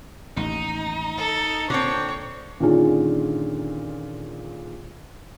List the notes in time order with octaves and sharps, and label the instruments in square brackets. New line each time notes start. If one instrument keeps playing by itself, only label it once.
[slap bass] A1 D#2 [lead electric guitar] D#4
[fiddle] A4
[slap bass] A#2 [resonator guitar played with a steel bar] D3 C4 [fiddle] C#5
[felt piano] A#2 D3 D#3 C#4 F4 G#4